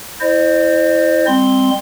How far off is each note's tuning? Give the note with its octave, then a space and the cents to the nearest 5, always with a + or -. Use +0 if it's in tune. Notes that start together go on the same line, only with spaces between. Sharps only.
E4 +0 C5 +5 D#5 -40
G3 +35 C4 +0 C6 +0